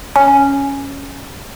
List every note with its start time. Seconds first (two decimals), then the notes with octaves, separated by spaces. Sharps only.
0.16 C#4